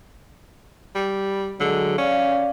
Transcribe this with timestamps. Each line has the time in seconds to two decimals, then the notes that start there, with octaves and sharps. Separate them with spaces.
0.95 G3
1.60 D3 F#3 G#3 G#4
1.98 C#4 D5 F5